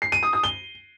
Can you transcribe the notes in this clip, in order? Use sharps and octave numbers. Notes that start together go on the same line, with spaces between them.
C7
D#7
D#6
D#6
G7